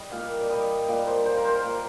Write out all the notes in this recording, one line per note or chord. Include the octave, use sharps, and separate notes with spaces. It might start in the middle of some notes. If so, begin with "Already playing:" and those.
Already playing: G3 D#5
A#2 F5
D5
G3 D#5
A#2 D5
C5
G3 C5
A#4
C5
A#2